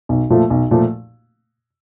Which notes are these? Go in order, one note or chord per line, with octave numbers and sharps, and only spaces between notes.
B1
A#2 F3 A3
B1
A#2 F3 A3